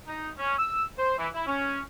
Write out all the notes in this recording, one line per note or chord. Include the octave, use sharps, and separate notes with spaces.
D#4
C#4
E6
C5
E3
E4
C#4